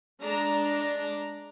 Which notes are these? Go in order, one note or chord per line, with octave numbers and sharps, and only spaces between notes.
G#3 D4 A#5